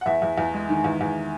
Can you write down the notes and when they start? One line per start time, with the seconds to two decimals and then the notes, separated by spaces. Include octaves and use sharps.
0.01 F#5
0.06 E2 E5
0.22 E2
0.38 E2
0.54 G#3
0.69 D#3
0.84 E2
1.01 E2